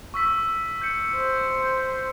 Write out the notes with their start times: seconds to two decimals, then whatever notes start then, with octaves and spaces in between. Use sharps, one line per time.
0.14 C#6 E6 B6
0.82 G6 C#7
1.15 C5